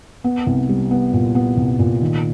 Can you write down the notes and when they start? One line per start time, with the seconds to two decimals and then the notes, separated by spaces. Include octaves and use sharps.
0.24 B3
0.47 C2
0.69 G3
0.91 B3
1.13 A#2
1.35 B3
1.57 C2
1.79 A#2
2.01 D#3